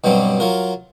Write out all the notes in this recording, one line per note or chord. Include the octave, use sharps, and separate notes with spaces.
G2 B2 F#3 G3 C4
F#3 F4 A#4